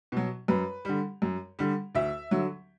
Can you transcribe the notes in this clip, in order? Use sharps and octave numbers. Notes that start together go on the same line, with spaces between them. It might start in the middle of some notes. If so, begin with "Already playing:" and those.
B2 F#3
F#2 B4
D3 G3
F#2
D3 G3
D2 E5
D3 F#3